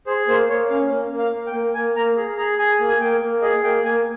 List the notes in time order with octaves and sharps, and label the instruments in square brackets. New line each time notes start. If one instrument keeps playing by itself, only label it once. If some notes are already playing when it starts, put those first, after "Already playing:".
[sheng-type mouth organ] G#4 C5
A#3 C5
A#3 C#5
C#4 F5
A#3
A#3
F5
A#3
G5
A#3
A#3 G#5
A#3 A#5
G#4
G#4 A#5
G#4 G#5
A#3
G#5
A#3 G5
A#3
G#4 D#5
A#3 G5
A#3 G#5